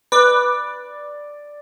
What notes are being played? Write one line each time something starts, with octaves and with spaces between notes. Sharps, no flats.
B4 D5